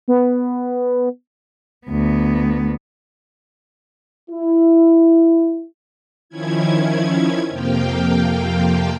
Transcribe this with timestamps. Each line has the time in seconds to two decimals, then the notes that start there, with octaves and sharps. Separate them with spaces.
0.08 B3
1.87 D2 B3
4.30 E4
6.29 D#3 F3 C#4 E4 G#6
7.50 F2 C3 F3 A#3 F5 G5